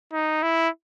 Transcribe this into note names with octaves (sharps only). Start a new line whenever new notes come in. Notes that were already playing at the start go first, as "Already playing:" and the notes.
D#4
E4